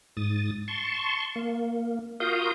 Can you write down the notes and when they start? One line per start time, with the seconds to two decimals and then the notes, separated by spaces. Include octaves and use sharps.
0.17 G#2 D#6 A6
0.68 A5 C6 C#6
1.36 A#3
2.20 F4 F#4 A#4 F5 D#6 G6